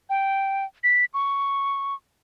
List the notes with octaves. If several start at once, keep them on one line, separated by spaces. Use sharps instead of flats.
G5
B6
C#6